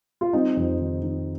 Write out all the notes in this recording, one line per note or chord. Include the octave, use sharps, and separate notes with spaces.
F4
G3 C4 D#4
F2
D#3
D#3